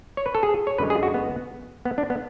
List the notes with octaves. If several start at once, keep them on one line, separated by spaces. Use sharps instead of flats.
C#5
B4
A4
G#4
C#5
F#2 D3 G#3 B4
G#4
F#4
B3
B3
D4
B3